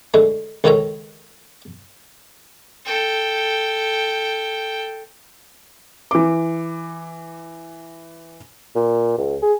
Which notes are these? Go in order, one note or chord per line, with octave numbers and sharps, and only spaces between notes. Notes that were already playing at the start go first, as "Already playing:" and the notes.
D3 G#3 A3
C#2 D#3 F4 A4 C#5 A#5
A4 G5
E3 D6
A#2
C#2
G#4